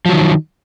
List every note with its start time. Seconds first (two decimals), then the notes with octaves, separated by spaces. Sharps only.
0.06 F3
0.09 F#3
0.13 D#3